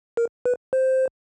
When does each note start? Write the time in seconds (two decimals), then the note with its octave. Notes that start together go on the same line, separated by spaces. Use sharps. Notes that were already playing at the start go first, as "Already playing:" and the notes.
0.17 A#4
0.45 B4
0.73 C5